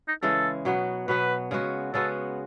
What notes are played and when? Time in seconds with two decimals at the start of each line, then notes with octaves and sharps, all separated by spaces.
0.08 D#4
0.23 C#3 E3 G#3 A4
0.65 B2 F#3 B3
1.08 B2 F#3 B3 B4
1.51 C#3 G#3 B3 F#4
1.94 C#3 G#3 B3 F#4 A4